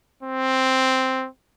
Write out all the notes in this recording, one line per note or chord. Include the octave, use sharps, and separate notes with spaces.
C4